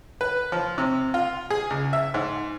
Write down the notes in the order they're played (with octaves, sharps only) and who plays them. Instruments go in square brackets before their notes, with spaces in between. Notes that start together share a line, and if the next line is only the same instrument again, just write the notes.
[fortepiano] B4
F3
C3
F4
G#4
C#2
E5
G#2